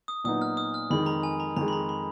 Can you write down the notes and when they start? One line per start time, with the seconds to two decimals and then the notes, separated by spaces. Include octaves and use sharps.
0.08 D#6
0.24 A#2 F#3 B3 D#4 D#6
0.42 F6
0.57 D#6
0.74 F6
0.90 F2 D#3 G#3 B5
1.06 A#5
1.23 G#5
1.40 A#5
1.57 F2 D#3 G#3 A#5
1.68 B5
1.73 A#5
1.89 B5